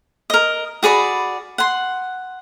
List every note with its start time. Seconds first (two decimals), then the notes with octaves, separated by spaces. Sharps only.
0.30 A#4 D#5
0.83 F#4 G#4 D5 B5
1.58 F#5 C6